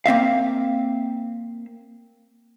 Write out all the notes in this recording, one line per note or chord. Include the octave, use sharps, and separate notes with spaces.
A#3 C4 E5 F5